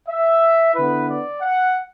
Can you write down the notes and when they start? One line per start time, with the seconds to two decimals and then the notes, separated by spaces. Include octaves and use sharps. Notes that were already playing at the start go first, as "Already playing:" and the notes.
0.09 E5
0.75 D3 B3 E4 B4
1.08 D5
1.41 F#5